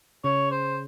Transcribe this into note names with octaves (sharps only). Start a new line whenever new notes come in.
C#3 C#5
C5